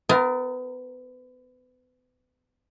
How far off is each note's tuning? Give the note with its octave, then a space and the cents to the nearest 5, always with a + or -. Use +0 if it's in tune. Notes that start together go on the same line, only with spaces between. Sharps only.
B3 +35 F4 -5 A#4 +0